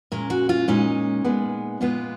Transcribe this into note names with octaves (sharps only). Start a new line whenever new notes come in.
A#2 G#3 C#4 A#4
F#4
F4
A#2 G#3 C#4 D#4
A#2 G#3 B3
A#2 G#3 B3 F4